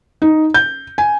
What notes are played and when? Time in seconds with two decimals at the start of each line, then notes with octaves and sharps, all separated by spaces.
0.22 D#4
0.54 G6
0.98 G#5